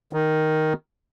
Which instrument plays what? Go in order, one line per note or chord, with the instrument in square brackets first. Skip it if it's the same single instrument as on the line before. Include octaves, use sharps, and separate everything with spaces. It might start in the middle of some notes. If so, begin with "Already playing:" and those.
[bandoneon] D#3